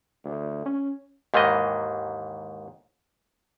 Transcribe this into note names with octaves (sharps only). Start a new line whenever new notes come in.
D2
C#4
D#2 G#2 D#3 E3 D#5